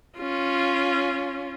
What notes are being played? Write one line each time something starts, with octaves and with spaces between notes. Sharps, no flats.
C#4 F4